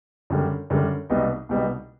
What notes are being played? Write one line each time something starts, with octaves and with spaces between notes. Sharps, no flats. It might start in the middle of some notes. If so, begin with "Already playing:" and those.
F#2 D3 G3
F#2 D3 G3
C2 B2 G3 B3 D#4
C2 B2 G3 B3 D#4